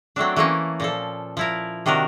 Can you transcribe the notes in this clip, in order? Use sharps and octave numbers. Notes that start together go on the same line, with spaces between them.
F#3 A3 C4 D4
E3 A3 A#3 C#4
A#2 F3 A4
F3 E4 A#4
C3 D#3 D4 F#4 A#4